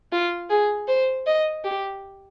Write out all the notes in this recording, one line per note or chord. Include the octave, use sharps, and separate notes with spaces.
F4
G#4
C5
D#5
G4